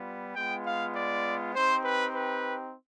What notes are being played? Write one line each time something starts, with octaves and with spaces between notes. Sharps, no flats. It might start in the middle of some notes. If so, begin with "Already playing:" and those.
Already playing: G3 B3 F4
G#3 B3 F4 G5
F5
D5
C4 D#4 G4 C5
B4
B4